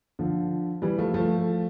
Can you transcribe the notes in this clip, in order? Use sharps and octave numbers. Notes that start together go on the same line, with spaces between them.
D3 F3
E3 G3
F3 A3
F3 A3